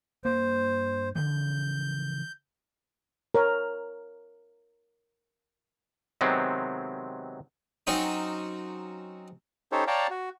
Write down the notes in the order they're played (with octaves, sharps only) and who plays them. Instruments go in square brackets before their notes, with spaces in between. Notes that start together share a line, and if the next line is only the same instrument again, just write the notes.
[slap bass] G2 A#3 [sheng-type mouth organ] C5
[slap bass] C#3 E3 F3 [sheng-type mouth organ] G6
[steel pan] A#4 C#5
[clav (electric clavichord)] C3 D#3 F#3 G#3 B3 C4
[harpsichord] F#3 C4 C#4 D#4
[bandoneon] C#4 D#4 G4 A4 C5 C#5
C#5 D5 F5 G5 A5 A#5
F#4